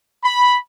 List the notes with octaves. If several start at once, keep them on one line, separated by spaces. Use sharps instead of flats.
B5